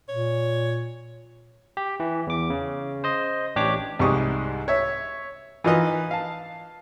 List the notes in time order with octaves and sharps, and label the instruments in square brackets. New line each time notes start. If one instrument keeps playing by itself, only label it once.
[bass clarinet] A#2 [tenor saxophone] C#5
[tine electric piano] G4
E3
E2 D6
C#3
C5 D#5
A1 D4 G4 C#5 D6
[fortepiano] C2 G#2 G3 C#6 D#6
C#5 E5
E3 D#4 F4 A#4 B4 D#5
F5 A5